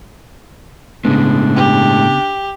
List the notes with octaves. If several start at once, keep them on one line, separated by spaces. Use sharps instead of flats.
A2 C#3 G#3 B3 D4
G4